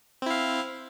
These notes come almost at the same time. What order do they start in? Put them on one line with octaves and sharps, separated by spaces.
C4 E4 F5